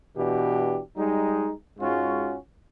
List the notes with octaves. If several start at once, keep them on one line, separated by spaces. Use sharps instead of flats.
B2 E3 D4 G4
G3 G#3 D#4
G#2 G#3 C#4 F4 F#4